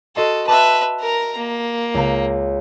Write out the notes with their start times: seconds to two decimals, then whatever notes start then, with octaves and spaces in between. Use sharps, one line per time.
0.16 F#4 A4 D#5 C6
0.48 B4 E5 A5 D6 F#6
1.00 A#4 A#5
1.37 A#3
1.94 C#2 A#5